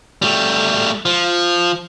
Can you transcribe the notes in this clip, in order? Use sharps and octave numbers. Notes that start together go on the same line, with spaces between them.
G3 A3
F3